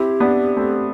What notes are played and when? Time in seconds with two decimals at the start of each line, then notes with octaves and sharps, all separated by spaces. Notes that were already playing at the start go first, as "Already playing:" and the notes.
Already playing: C4 E4 G4
0.20 B3 D4
0.57 A3 C4